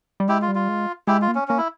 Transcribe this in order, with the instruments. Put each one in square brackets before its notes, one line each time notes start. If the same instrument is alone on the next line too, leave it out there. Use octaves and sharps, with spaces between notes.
[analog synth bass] G3
[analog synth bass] G#3 [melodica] E4 G4
[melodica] F4
[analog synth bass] G3
[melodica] F4
[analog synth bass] G#3
[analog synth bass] G#3 [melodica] E4 G4
[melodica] F4
[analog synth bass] A#3
[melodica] C#4
[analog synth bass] A#3 [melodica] C#4
[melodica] E4